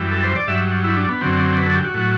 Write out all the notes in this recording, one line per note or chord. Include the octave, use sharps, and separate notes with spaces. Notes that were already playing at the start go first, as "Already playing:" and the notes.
Already playing: F#2 E3 G3
A4
C5
D5
G2 F#3 E5
E4
D4
B3
F#2 D3 F#3 C4
B4
A4
G4
F#4
A2 F#3